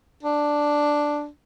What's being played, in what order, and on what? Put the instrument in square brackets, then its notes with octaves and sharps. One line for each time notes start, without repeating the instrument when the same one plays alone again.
[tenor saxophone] D4